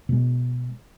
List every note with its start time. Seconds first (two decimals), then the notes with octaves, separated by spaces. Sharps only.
0.09 B2 G#3